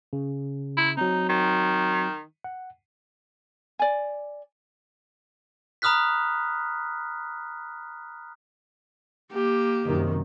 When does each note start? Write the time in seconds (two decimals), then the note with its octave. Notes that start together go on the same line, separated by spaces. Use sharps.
0.13 C#3
0.77 E4
0.97 F#3 C4 D#4
1.29 D#3
2.44 F#5
3.79 D5 G#5
5.82 A#5 B5 D#6 F6 F#6 B6
9.32 A#3 G4
9.86 F#2 C3 D#3